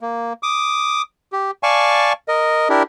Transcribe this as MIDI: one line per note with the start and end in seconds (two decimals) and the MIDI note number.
0.01 0.33 58
0.43 1.02 86
0.43 1.02 87
1.32 1.51 67
1.63 2.13 74
1.63 2.13 77
1.63 2.13 80
1.63 2.13 81
1.63 2.13 85
2.28 2.69 70
2.28 2.69 75
2.70 2.83 62
2.70 2.83 64
2.70 2.83 67
2.70 2.83 70